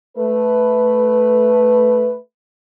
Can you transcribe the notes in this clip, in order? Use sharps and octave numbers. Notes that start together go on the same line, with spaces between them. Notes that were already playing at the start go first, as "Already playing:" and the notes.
A3 B4